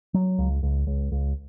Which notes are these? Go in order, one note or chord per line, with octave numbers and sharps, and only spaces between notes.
F#3
C#2
C#2
C#2
C#2